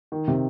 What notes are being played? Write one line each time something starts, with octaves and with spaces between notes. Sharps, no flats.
D#3
C3